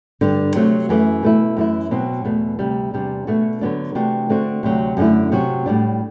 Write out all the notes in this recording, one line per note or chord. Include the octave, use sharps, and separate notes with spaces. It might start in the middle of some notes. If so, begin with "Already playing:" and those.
G2 D3 G3 D4
C3 F#3 A3 C4
F#2 E3 A3
B2 A3 E4
F#2 E3 A3 E4
B2 F#3 C4
E2 B2 A3
D2 C3 G3
E2 C3 G3 D4
B2 A3 D4 F#4
D3 F#3 B3 D4
C3 E3 A3 D4 F#4
D3 A3 C4 F#4
D2 C3 F#3
F#2 D3 A3 E4
C3 F#3 C4 F#4
A2 G3 D4